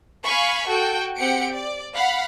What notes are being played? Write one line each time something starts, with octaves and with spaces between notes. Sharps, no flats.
F5 G#5 B5 C#6
F#4 A4 G5
C4 G4 F#5 G5 C#7 D7
D5
F5 F#5 B5